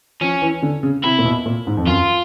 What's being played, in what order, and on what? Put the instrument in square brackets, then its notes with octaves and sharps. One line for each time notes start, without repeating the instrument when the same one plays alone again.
[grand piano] F3 [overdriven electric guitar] C#4
[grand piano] E3
D3
C#3
[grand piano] C3 [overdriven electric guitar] E4
[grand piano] A#2
B2
A#2
G#2
F2
[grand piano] F#2 [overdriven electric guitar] F4